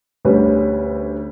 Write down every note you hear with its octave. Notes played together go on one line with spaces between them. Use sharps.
D2 G3 C#4 B4